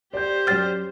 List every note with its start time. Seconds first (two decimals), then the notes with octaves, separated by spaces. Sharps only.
0.14 G4 C5 D5 G6
0.47 F#2 D5 G5 F6 A6